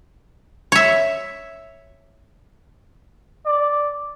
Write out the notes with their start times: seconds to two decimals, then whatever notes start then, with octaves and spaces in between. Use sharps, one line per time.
0.72 C#5 E5
3.46 D5